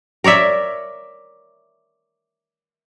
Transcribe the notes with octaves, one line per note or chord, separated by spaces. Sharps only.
A#4 C#5 D5 E5